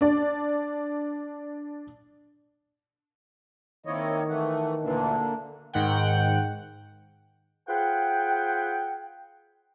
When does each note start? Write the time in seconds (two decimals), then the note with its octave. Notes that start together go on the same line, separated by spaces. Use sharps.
0.01 D4 D5
3.86 D#3 A#3 C4 E4 C#5 D#5
4.29 E3 A3 F#5
4.83 D2 A#2 D3 E3 A#3 D4
5.73 G#2 D#3 F#5 G5
7.69 F4 G#4 B4 C5 F#5 G5